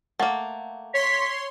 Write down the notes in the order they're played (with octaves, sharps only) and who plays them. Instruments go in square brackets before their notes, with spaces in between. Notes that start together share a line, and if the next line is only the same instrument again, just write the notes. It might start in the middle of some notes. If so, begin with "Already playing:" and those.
[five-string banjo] A3 A#3 [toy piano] F#5
[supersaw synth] C#5 C6 [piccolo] B6